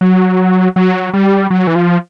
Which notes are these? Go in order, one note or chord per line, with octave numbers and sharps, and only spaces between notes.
F#3
F#3
G3
F#3
E3
F3